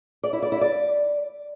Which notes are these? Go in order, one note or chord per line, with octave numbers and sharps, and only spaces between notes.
D5
E4
D5
E4
D5